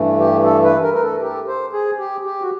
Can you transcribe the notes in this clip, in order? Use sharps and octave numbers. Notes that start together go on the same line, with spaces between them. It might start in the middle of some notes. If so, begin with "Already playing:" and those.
Already playing: G2 E3 A3
G4
A4
B4
A#4
A#4
A4
G4
C5
G#4
G4
G4
F#4